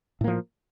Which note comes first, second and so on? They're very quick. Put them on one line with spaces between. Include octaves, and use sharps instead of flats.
A2 A#3 F3